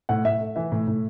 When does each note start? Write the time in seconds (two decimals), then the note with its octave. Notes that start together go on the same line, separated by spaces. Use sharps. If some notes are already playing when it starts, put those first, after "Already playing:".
0.09 A2 F#5
0.25 A2 E5
0.40 A3
0.56 E3 E5
0.72 A2
0.87 A2